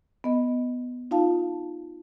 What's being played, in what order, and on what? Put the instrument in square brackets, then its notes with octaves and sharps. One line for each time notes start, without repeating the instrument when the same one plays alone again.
[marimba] B3 D#5
D#4 F4 F5 A5